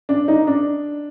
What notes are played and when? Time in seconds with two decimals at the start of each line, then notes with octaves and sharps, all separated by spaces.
0.09 D4
0.28 D#4
0.47 D4